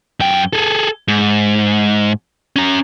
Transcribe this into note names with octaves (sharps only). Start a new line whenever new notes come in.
F#2 G5
G#4 A4
G#2
C#4 A#5